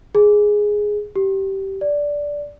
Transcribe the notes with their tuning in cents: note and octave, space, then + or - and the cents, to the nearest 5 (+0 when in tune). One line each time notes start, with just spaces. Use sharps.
G#4 +0
G4 -20
D5 -10